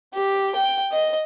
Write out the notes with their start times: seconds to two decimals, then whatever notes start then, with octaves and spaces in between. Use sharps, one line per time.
0.14 G4
0.55 G5
0.92 D#5